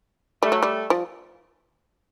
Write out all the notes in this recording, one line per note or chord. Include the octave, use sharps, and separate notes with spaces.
G3 A3
F#3
G3
F3